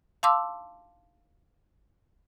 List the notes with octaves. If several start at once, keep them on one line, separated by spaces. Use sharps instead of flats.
F5 A5 C6 D6 E6